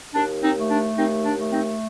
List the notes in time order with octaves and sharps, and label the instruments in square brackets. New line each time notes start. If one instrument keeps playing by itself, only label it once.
[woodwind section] D#2 D4
C4 D#4
A3
D4
D#2 C4 D#4
D4
A3
C4 D#4